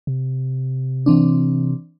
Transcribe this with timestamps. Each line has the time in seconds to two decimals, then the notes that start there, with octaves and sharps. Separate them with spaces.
0.07 C3
1.06 E3 C4 D4